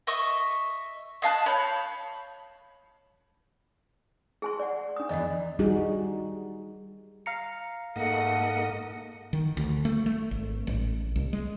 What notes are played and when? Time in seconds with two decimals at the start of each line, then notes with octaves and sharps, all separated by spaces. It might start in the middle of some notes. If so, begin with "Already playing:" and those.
0.07 D#5 E5 C#6
1.22 D#5 F5 A5 F#6
1.46 C#5 B5 G6
4.42 G#4 G#5 C6
4.59 D5 F#5
4.96 D4 D#6
5.09 E2 E3 D5 D#5
5.59 G3 D#4 F#4 G#4
7.26 F5 A#5 C#7
7.96 G#2 A3 A#3 D#5 F#5
9.33 D#3
9.57 D2
9.85 A3
10.06 A3
10.31 G#1
10.67 A1
11.16 C2
11.33 G#3